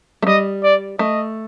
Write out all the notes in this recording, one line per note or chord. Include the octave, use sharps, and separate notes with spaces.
A3
G3 D#5
D5
A3 D#5